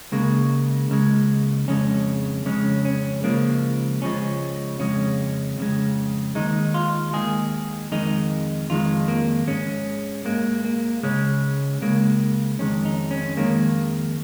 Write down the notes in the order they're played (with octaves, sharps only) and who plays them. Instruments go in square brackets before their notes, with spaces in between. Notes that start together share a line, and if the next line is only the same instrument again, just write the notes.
[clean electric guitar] C#2 C#3 G#3 A#3
C#2 C#3 G#3
F2 C#3 G#3 C#4
F2 C#3 G#3 C#4
C#4
C#2 C#3 F3 G#3 A#3
C#2 C#3 F3 G#3 C#4
F2 C#3 G#3 C#4
F2 C#3 G#3
D#2 D#3 G#3 D#4
F4
D#2 D#3 G#3 G#4
F2 D#3 G#3 D#4
F2 D#3 G#3 F4
A#3
G#2 G#3 C#4
G#2 G#3 A#3
A#3
C#2 C#3 G#3 C#4
C#2 C#3 G#3 A#3
F2 D#3 G#3 C#4
D#4
C#4
F2 D#3 G#3 A#3